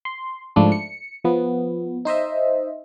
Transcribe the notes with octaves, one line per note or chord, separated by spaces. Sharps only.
C6
G#2 F3 A3 D4 E4
C#7
F3 B3
D#4 C5 D#5 E5